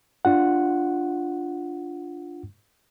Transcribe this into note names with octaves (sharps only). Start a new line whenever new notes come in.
D4 F4 F#5